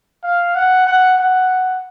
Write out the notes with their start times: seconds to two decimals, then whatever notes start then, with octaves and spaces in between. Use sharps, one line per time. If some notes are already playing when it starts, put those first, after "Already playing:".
0.24 F5
0.55 F#5
0.87 F#5
1.18 F#5